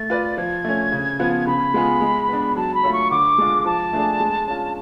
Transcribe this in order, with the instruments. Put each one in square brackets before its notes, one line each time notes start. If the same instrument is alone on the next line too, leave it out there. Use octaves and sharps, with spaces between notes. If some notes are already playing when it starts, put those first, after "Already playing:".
Already playing: [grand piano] A3 [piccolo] A6
[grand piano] F4 B4 D5
[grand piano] F3 [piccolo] G#6
[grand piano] A3 C#4
C#3
F3 B3 F4 B4
[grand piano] C#3 [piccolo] B5
[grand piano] G#3 B3 F4 G#4
G#3
B3 D4
[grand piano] F#3 [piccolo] A5
[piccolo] B5
[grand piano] A3 F4 A4 C#5
[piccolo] C#6
[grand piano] D3 [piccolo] D6
[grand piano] G#3 D4 F4
[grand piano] F3 [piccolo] A5
[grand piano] A3 D4 G#4 D5
G#3
C#4 F4